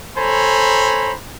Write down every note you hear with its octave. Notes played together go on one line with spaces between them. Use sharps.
A4 C5 C#5 G#5 A#5 B5